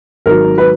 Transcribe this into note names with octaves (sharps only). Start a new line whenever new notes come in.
G#1 G#2 F#3 A#4
B4